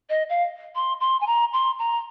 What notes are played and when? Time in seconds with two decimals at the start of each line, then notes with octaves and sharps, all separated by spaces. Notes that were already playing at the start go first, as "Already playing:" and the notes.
0.10 D#5
0.29 F5
0.75 C6
1.01 C6
1.21 G#5
1.27 A#5
1.53 C6
1.79 A#5